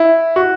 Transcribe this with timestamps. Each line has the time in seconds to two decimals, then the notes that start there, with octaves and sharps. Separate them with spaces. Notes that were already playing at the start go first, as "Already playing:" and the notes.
Already playing: E4
0.36 F#4